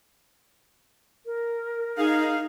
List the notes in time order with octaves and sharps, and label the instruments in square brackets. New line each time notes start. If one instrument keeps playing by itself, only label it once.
[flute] A#4
[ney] D#4 [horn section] G#4 F5